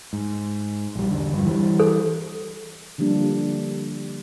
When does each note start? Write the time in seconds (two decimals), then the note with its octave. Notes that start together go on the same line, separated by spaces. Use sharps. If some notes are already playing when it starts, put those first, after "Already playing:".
0.13 G#2
0.96 A#1 G3
1.11 E2 D3
1.33 G2 F3
1.45 E3 F#3 G3
1.80 A4
2.98 D3 F3 G3 A#3 D4